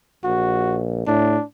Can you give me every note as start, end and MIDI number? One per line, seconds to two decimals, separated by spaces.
0.24 1.06 34
0.24 0.82 66
1.07 1.37 45
1.07 1.44 62